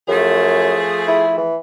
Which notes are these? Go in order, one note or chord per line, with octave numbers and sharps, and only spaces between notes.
F#2 F3 A3 G#4
E4
E3